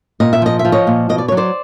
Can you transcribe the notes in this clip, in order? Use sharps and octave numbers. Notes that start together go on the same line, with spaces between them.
A#2 D#5
E5
F3 D#5
E5
F3
C#5 D#5
A#2
B2 D#5
D5
C#5
F#3
C5 D5